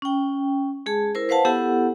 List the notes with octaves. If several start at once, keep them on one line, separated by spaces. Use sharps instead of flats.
C#4 G5
G#3 G#4 A5
E4 A#4 C5
B4 C5 F5 F#5 A5
B3 E4 G4 A4 F#5